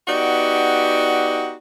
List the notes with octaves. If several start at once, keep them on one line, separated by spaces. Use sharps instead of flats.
B3 D#4 F#4 G4 D5